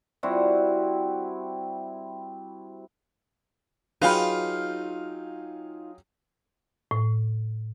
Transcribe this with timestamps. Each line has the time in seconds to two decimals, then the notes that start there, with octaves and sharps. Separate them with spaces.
0.23 G3 C4 E4 F#4
4.01 F#3 D#4 F4 G#4 B4 F5 G5 B5
6.91 A2